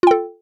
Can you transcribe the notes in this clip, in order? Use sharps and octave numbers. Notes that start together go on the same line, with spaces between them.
F4 A4 G5